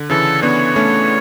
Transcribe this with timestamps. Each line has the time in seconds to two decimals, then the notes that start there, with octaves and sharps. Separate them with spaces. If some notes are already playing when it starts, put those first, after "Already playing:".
Already playing: D3
0.10 C#3 E3 A4
0.42 B3 D4 C#5
0.76 A3 C#4